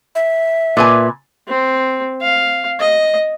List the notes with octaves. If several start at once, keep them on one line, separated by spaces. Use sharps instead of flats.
E5
A#2 B4 G#5
C4
F5
D#5